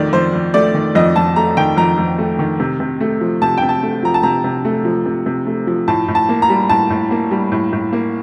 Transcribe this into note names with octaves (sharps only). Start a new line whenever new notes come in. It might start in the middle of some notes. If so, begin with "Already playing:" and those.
Already playing: F2 D#3 A3 D5
F2 C5
F2
A3 D5
D#3
F2 D#5
F2 A5
A3 A#5
D#3 G5
F2 A#5
F2
A3
D#3
C3
C3
A3
F3
C3 A5
C3 G5
A5
A3
F3 A#5
A5
C3 A#5
C3
A3
F3
C3
C3
A3
F3
A2 A5
A2
A5
A#3
A#5
G3
A2 A5
A2
A#3
G3
A2
A2
A#3